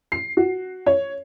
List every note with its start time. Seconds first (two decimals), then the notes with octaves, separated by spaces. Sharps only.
0.12 C7
0.37 F#4
0.86 C#5